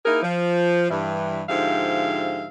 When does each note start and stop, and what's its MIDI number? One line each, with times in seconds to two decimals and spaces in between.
0.06 0.21 58
0.06 0.21 63
0.06 0.21 64
0.06 0.21 68
0.06 0.21 70
0.23 0.90 53
0.90 1.43 43
0.90 1.43 52
1.49 2.48 44
1.49 2.48 50
1.49 2.48 53
1.49 2.48 67
1.49 2.48 76
1.49 2.48 77